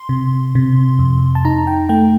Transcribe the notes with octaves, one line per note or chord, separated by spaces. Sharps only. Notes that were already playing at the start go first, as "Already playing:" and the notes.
Already playing: C6
C3
C3
F2
A5
D#4 A#5
G5
A3 G5